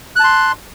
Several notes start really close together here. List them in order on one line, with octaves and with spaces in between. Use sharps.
F#6 A5 C6